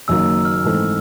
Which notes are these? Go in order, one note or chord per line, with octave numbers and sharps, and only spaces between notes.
F#1 F#2 D#3 F#3 A#3 E6
F6
G#2 E3 A3 C4